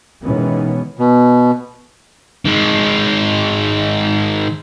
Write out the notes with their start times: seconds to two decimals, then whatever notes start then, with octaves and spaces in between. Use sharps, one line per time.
0.23 B2 D#3 E3 G#3 B3 C#4
0.97 B2
2.45 D#3 G#3